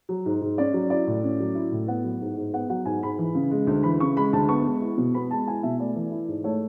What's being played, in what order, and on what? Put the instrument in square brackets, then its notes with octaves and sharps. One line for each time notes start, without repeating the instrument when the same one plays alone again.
[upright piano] F#3
G#2
G#2
C#4 D5
F#3
E4 D5
A2
C#4
F#3
E4
A2
B3 F#5
F#3
G#2
G#2
B3 F#5
F#3 F#5
G#2 G#5
G#2 B5
E3
C#3
G#3
D2
E3 B5
C#3 C#6
G#3 B5
D2 A5
B3 C#6
G#3
E4
B2
B3 B5
G#3 A5
E4 G#5
B2 E5
A3 D5
E3
E4
G#2
A3 C#5